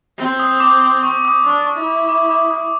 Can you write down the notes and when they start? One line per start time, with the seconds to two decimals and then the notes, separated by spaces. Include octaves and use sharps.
0.18 C4
0.40 D#6
0.60 D6
0.82 D6
1.03 C#6
1.25 D#6
1.45 D4 C#6
1.66 C#6
1.77 E4
1.87 D6
2.09 D6
2.30 D6
2.51 D#6